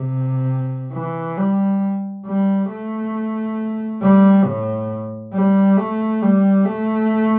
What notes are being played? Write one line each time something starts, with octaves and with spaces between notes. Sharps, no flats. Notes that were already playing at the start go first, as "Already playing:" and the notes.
Already playing: C3
E3
G3
G3
A3
G3
A2
G3
A3
G3
A3